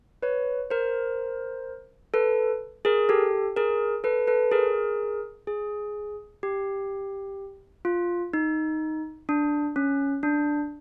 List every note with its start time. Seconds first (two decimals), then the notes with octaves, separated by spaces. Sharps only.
0.22 B4 C#5
0.70 A#4 C5
2.14 A4 B4
2.85 G#4 A#4
3.09 G4 A4
3.57 G#4 A#4
4.04 A4 B4
4.27 A4 B4
4.52 G#4 A#4
5.47 G#4
6.43 G4
7.85 F4
8.34 D#4
9.29 D4
9.76 C#4
10.23 D4